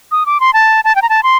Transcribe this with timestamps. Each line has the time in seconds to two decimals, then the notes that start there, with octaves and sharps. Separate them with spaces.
0.12 D#6
0.26 D6
0.40 C6
0.53 A5
0.84 A5
0.96 G5
1.02 A#5
1.09 A5
1.23 C6